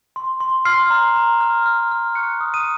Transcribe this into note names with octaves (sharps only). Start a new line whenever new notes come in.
C6
C6
C6 F6 C7
A#5
A#5
F6
F6
F6
C#6 F#6 C#7
D#6
D#6 D#7